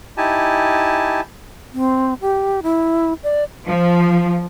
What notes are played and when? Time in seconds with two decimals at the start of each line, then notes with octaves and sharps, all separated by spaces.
0.17 D#4 E4 G4 G#5 A5
1.73 C4
2.21 G4
2.63 E4
3.23 D5
3.68 F3